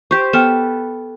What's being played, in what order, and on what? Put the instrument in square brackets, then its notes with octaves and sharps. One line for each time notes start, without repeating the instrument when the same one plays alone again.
[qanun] G4 C5 [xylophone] C#6 G6
[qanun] B3 A4 [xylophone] G5 F6 E7